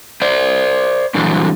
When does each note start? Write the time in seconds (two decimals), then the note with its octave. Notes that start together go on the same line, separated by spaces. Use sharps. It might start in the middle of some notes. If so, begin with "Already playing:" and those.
0.22 C5 D5
1.14 G2 A#2 D3 E3 F#3